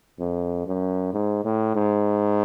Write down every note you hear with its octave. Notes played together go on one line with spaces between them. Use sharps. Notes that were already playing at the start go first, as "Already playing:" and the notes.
F2
F#2
G#2
A2
G#2